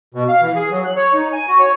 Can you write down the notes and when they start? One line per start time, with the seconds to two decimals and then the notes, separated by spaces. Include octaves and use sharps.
0.14 B2
0.29 F5
0.42 E3
0.56 G#4
0.71 F#3
0.85 F#6
0.96 C#5
1.14 D#4
1.33 G#5
1.48 F#4
1.59 C#5